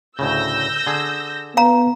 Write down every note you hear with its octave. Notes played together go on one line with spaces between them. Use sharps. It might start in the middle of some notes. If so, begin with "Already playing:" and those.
D2 A2 C#3 E6 G6 A#6
D3 G#4
B3 F5 A#5